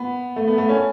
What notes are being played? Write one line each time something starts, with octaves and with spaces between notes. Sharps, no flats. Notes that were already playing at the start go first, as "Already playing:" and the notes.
Already playing: B3
A3
B3
A3
C#4